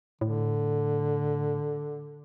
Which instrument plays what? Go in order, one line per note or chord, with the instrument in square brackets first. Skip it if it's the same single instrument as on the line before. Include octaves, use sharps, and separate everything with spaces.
[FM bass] A2 [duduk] D3